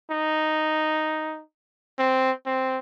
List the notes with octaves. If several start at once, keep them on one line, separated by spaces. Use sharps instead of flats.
D#4
C4
C4